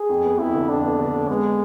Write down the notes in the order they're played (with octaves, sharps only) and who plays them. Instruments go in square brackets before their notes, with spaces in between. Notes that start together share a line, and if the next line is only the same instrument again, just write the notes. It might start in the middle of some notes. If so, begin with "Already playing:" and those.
Already playing: [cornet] G#4
[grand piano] F2
B3
[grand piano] F2 [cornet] E4
[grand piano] D3
[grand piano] F2 [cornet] D4
[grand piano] B3
D3
D3
[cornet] G#3 [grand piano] B3